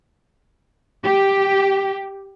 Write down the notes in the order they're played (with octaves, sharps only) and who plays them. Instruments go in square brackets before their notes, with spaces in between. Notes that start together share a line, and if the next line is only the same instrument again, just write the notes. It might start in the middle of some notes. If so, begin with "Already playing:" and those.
[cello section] G4